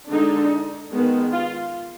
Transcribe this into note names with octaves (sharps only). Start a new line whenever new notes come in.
D3 G#3 D4 D#4
D#3 G#3 B3
F4